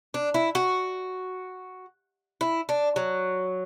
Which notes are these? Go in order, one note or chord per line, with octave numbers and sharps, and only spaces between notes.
D4
E4
F#4
E4
D4
F#3